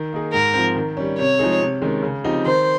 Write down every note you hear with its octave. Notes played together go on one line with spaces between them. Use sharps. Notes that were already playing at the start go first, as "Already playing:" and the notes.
Already playing: D#3
A#3 D#4 G#4
G#2 A#4
F3 C4
D#3
G3 C#4
C3 C#5
F3 G#3 D#4 G#4
C3
D#3 G#3 C#4
C#3
F3 C4 D#4 G4
D#3 C5